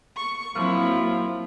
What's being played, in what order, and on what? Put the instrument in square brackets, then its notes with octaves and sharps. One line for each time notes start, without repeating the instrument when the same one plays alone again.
[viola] C#6
[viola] F3 E4 [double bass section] F#3 A#3 C4